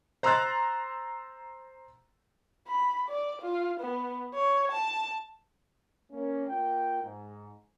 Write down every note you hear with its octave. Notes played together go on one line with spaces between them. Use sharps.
C5 A#5 C6 E6 F#6 A6
B5
D5
F4
B3
C#5
A5
A#3 C#4
A#3 F4 G5
G#2